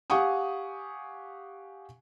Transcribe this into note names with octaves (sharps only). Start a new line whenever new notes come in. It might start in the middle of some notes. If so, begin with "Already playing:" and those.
G4 F5 F#5 G#5 C#6 D#6